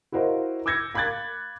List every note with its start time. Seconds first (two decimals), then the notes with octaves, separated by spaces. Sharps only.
0.12 E4 F#4 A#4 C5 D#5 F5
0.66 D6 E6 G6 G#6 A#6 C#7
0.94 F5 B5 D6 F#6 G#6 A6